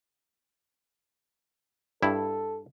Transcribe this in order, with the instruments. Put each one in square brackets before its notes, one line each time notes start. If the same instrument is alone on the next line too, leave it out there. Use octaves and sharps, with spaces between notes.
[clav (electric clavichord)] G2 E4 [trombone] A4